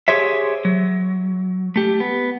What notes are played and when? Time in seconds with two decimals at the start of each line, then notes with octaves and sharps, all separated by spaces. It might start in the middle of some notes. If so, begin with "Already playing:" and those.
0.08 G4 G#4 C5 C#5 E5
0.65 F#3
1.76 A3 G4
2.00 B3